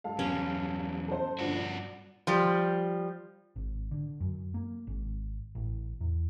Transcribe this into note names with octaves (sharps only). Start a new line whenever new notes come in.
G2 A4 F5
E2 F#3 C#4
A4 C5
G1 G2 A#2 D4 F#4
D5
F3 G3
G#1
D3
F#2
A#3
G#1
A1
E2